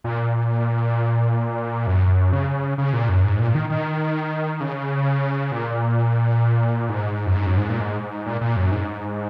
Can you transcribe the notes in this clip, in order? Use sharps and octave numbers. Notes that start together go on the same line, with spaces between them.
A#2
F#2
C#3
C#3
A#2
F#2
G#2
A#2
D#3
D#3
C#3
A#2
G#2
F#2
G#2
F#2
G#2
A#2
G#2
A#2
A#2
F#2
G#2